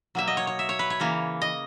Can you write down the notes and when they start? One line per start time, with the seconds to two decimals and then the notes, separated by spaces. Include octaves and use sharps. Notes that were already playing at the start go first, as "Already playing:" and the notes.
0.15 B2 F#3 A#3 E5
0.27 D#5
0.37 C#5
0.47 C#5
0.59 E5
0.69 C#5
0.79 B4
0.90 C#5
1.00 C#3 E3 A#3
1.42 D#5